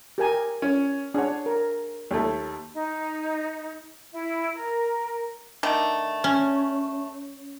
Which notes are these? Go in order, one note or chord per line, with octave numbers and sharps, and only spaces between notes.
G4 A#4 G#5
C#4
D4 G#4 C#5 F#5
A#4
D#2 A3
D#4
E4
A#4
D3 D#3 A3
C#4